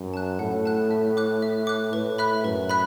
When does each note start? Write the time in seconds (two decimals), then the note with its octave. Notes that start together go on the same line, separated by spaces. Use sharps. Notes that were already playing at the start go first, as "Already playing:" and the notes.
Already playing: F#2
0.14 A5 F#6
0.39 A2 F#5
0.65 A5 F#6
0.91 E5
1.17 D6 F#6
1.42 E5
1.67 D6 F#6
1.93 A2 B4
2.18 E5 B5 F#6
2.44 F#2 B4
2.69 E5 B5 F#6